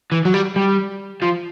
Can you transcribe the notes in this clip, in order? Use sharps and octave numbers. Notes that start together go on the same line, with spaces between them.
E3
F#3
G3
G3
F3